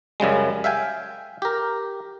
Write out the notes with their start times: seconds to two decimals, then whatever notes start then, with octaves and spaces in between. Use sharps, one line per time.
0.20 F#2 C#3 G3 G#3
0.64 E5 F5 G5 G#5
1.42 G4 A#4